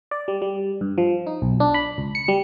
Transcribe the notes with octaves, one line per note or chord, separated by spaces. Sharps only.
D5
G3
G3
G2
F3
D#4
B1
D4
B5
C#2
C#7
G3